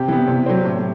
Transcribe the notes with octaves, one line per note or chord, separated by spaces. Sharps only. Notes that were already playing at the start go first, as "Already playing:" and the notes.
Already playing: C3 G4
E3 B3
C3
F#3 C4
A2